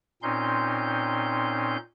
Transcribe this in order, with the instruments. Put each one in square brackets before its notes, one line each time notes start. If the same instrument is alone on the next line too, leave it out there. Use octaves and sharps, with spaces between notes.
[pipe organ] A#2 C4 C#4 D#4 C6 G6